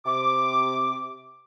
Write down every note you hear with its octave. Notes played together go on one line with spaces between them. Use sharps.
C3 D6